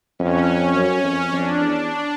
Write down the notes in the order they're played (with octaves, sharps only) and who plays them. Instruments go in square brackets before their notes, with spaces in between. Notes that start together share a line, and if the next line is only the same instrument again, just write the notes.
[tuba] F2 [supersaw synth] C#4
[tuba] F#2
F2
[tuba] F2 [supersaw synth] D4
[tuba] E2